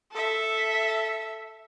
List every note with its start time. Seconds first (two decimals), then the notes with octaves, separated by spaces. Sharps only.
0.12 A4 E5